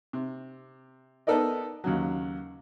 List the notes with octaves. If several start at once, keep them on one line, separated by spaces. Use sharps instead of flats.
C3
B3 D#4 A4 A#4 D5 D#5
D#2 C#3 F#3